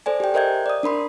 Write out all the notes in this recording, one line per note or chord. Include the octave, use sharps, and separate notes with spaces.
A4 C5 D5 G#5
G4 G5
A#4 C5 D#5 E5 G6 G#6
D5 D#6
D4 A#4 B5 C6